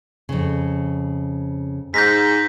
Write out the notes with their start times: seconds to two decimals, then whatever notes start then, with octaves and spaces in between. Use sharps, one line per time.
0.29 F2 C#3
1.94 G#2 G6 A#6 B6